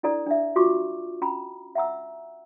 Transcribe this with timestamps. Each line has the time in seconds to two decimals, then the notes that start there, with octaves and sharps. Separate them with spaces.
0.03 D4 E4 A4 D5 A#5
0.26 D4 D5 E5
0.56 F4 F#4 C#6 D6
1.22 C#4 A#5 B5
1.75 E5 F#5 A#5 E6